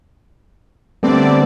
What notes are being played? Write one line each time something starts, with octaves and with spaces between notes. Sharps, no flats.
D3 G3 A3 B3 C4 D5